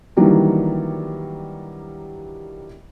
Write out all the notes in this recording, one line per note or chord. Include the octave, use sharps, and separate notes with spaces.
D#3 E3 F#3 G3 A#3 D4